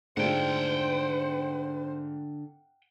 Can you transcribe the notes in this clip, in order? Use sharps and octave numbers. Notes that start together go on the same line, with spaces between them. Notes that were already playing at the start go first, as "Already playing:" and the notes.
G#2 D3 A3 F4 C5 F#5 G5